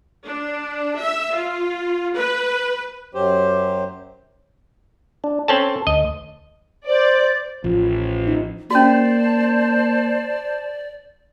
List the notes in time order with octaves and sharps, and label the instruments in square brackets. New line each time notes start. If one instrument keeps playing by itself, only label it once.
[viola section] D4
E5
F4
B4
[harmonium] F#2 F#3 G4 C5
[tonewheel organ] D4
[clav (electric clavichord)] C4 C#4 A5 [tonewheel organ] A4
[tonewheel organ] D2 [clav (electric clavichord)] D#5
[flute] C5 [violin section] D5
[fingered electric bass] A1 [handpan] F3
[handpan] D#4
[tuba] A#3 [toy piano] C#4 F#4 [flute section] C5 A5 [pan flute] D5